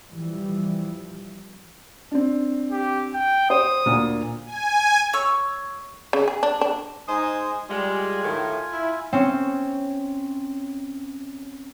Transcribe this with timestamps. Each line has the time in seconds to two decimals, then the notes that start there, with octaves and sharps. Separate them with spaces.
0.12 E3 F3 G3
2.12 C4 D4
2.72 G4
3.14 G5
3.50 C5 D#6
3.86 D2 A#2
4.46 G#5
5.13 C#5 C#6 E6
6.13 C#3
6.28 G#4
6.43 D4
6.61 D4
7.08 G#3 D#4 C5 G#5 D#6
7.69 G3 G#3 F4 G#5
8.23 A2 D#3
8.72 E4
9.13 C4 C#4